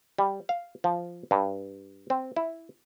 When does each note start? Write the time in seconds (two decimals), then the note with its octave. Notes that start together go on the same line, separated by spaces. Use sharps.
0.18 G3
0.49 F5
0.84 F3
1.31 G2
2.10 C4
2.36 E4